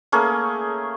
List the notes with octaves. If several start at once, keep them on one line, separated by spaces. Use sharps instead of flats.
A3 A#3 C#4 G#4